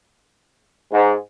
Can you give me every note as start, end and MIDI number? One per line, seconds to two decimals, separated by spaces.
0.92 1.13 44